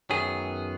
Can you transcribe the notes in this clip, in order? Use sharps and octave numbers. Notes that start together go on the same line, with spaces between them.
F#2 D#3 F#3 B3 G#4